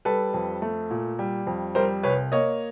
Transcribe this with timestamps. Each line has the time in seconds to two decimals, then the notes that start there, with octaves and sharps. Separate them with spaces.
0.05 G3 A4 B4
0.34 F2
0.62 A3
0.90 A#2
1.19 G3
1.47 F2
1.75 G3 A#4 C5
2.03 C2 B4 C#5
2.32 A#3 C#5 D#5